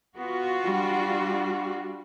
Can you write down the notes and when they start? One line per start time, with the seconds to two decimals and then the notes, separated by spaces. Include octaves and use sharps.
0.16 B3 F4 F#4
0.64 G3 D4